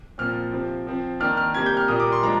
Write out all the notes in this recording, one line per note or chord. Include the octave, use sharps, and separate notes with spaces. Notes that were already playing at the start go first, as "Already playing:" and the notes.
A#2 F3 C4 F6
C3 F3 C4
F3 C4
D#3 A#3 D4 F6
F6
C3 G3 A#3 G#6
G6
F6
A#2 G3 A#3 D#6
D6
C6
F3 G#3 D4 A#5